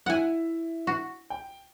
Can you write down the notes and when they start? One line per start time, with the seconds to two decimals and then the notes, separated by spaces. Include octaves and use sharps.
0.06 E4 E5 F#5 G#5
0.87 F#4
1.30 G5